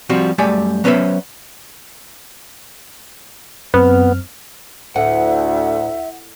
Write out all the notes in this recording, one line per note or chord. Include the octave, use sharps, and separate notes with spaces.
F3 G3 C4 F4 F#4
F#2 G3 A3 G4 D5 G#5
F#3 B3 C#4 B4 C5 E5
F#2 B3 C4 F6
D2 A2 E5 F#5